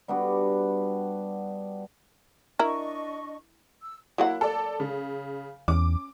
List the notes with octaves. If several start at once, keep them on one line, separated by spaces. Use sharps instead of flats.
G3 B3 D4 F#4
D4 E4 A#4 D#5 C#6
E6
F#3 A#3 E4 F#5
A4 D5
C#3
E2 C#4 D6